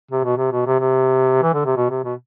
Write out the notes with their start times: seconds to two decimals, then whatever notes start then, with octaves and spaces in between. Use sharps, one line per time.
0.11 C3
0.24 B2
0.37 C3
0.52 B2
0.66 C3
0.80 C3
1.43 E3
1.54 D3
1.65 C3
1.76 B2
1.90 C3
2.04 B2